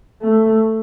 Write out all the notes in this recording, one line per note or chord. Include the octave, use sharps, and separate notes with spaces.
A3